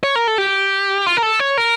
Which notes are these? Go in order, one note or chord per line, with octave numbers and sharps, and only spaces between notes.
C#5
A#4
A4
G4
F4
A#4
A4
C#5
A#4